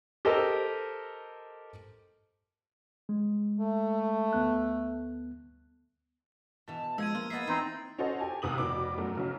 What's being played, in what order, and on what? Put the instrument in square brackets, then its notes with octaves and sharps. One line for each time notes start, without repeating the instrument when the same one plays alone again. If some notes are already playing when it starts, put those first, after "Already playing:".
[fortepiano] G4 A4 A#4 C5 D#5
[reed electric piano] G#3
[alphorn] A3
[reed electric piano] D2 B3 F#6
[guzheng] B2 E3 [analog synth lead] A5
[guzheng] F3 [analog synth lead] G#3 [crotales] E6 G#6 D#7
[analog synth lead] A#3 [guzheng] F4
[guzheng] B3 D#5 E5 [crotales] A6 C7
[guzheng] E3 [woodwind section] C4 D#4
[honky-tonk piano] C#4 F#4 A4 C5 D#5
G4 G#5 A5
D#2 C3 D#6 F#7
F1 B2 D6
F#2 F#3 A3
B1 C#3 F#3